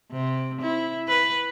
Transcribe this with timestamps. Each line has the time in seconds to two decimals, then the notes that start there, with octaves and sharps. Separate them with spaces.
0.12 C3
0.61 E4
1.08 B4